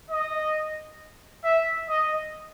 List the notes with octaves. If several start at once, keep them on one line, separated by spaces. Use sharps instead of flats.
D#5
E5
D#5